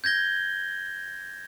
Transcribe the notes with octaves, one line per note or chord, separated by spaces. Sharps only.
G6 G#6 A#6 G7